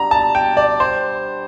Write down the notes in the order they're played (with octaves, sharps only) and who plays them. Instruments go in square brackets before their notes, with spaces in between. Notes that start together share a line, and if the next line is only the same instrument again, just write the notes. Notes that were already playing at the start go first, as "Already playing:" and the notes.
Already playing: [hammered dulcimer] G3 D4 F#4 [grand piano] A#5
[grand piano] A5
G5
D5
C5